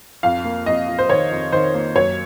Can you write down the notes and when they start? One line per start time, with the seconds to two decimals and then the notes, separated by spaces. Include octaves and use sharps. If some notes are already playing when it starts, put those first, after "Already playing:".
0.23 F2 F5
0.44 A#3
0.66 F2 D#5
0.88 F2
0.98 C5
1.09 D#3 C#5
1.31 F2
1.52 D#3 C5
1.74 A#3
1.95 F#2 C#5